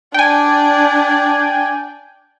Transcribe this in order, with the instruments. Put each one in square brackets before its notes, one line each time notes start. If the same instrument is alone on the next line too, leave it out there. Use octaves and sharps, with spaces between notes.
[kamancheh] D4 D5 [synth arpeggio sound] G5 G#5